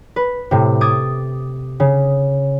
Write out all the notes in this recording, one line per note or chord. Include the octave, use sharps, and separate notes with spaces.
B4
A2 C3
D6 D#6 G#6 A6
C#3